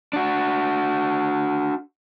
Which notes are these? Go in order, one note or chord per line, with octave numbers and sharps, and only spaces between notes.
D4 F#4